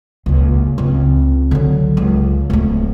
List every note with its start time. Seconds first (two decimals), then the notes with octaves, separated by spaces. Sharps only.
0.26 D#1 C#2
0.78 C#2 C4
1.51 D3 F#3
1.97 C#2
2.50 D1 A3